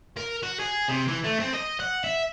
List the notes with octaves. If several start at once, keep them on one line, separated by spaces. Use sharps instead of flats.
A#4
F#4
G#4
C3
E3
A3
C4
D#5
F#5
E5